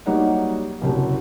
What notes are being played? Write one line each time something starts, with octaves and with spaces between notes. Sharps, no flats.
F#3 G3 A#3 D#4 C#5 F#5
F#1 C2 F#3 G4